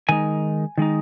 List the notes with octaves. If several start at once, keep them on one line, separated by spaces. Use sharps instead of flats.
D#3 G#3 D#4 G#5
D#3 G#3 D#4